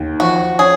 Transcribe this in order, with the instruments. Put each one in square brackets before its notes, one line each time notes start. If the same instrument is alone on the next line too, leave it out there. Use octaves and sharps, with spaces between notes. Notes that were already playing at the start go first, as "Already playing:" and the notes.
Already playing: [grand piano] D#2
[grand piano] F3 [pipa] F#4
[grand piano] C#4 [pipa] G#4